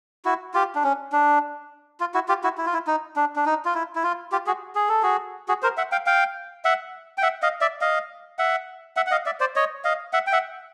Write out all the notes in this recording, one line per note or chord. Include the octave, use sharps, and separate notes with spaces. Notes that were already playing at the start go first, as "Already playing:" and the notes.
E4 F#4
F4 G4
D4
C#4
D4
F4
E4 F#4
F4 G4
E4 F#4
E4
F4
E4
D#4
D4
D4
D#4
F4
E4
E4
F4
F4 G4
F#4 G#4
G#4
A4
F#4 G#4
F#4 G#4
A#4 C5
E5 F#5
F5 G5
F5 G5
E5 F#5
G5
E5 F#5
D#5 F5
D5 E5
D#5 F5
E5 F#5
E5 F#5
F#5
D#5 F5
D5 E5
C5 D5
C#5 D#5
D#5 F5
E5 F#5
G5
E5 F#5